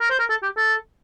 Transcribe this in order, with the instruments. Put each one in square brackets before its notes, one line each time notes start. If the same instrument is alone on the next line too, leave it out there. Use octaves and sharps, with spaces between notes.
[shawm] A#4
C5
A#4
A4
G4
A4